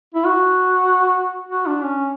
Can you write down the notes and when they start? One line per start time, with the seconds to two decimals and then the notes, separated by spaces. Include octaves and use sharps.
0.14 E4
0.26 F#4
1.49 F#4
1.67 D4
1.84 C#4